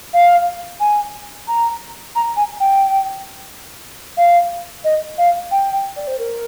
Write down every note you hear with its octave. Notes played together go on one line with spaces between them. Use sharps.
F5
G#5
A#5
A#5
G#5
G5
F5
D#5
F5
G5
D5
C5
A#4